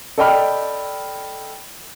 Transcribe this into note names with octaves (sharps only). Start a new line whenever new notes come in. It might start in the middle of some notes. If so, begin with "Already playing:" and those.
A4 D5 D#5 G5 B5 F6